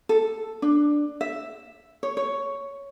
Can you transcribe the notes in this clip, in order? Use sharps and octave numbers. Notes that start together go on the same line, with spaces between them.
A4
D4
E5
C#5
C#5